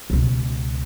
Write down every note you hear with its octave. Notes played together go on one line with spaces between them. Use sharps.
C#2 B2